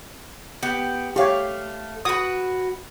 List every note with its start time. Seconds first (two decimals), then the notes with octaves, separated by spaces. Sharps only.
0.62 B3 G4
1.16 A3 G4 C#5 F5
2.05 F#4 B4 D#6